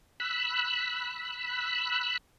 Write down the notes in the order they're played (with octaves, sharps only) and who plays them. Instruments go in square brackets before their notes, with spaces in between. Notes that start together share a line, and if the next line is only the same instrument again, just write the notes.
[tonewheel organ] B5 E6 F#6